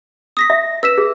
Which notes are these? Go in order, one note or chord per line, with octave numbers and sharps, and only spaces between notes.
D#6 A#6 B6
E5
B4 E6 B6 E7
G#4